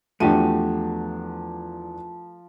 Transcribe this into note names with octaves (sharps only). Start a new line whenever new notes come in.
E2 F3 A3 D4 F#4 G4 D#7